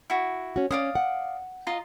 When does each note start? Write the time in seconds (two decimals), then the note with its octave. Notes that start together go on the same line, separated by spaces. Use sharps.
0.10 E4 F#4
0.56 C#4 F#4
0.71 C#4 D5 F5 D#6
0.95 F#5
1.67 F4 D#5 A#5